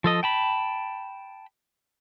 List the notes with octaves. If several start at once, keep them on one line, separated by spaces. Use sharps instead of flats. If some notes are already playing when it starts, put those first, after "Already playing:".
F3 A4 D#5
G5 A5 B5